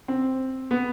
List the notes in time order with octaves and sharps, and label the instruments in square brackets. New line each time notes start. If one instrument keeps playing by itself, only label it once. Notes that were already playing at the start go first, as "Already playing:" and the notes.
[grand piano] C4
B3